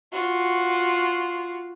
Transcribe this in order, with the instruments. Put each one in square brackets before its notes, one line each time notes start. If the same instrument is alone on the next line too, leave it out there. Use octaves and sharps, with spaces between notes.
[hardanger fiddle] F4 F#4